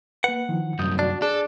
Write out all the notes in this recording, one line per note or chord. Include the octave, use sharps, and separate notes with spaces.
A#3 B4 F#5
D#3 F3 E4
C2 F#2 C3 D#6 G6
D4 F#4 D5
D4 G#4 A4 D5